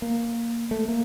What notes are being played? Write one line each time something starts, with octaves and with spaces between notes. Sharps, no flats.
A#3
A3
A#3